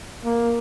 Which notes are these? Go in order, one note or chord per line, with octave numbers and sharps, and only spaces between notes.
A#3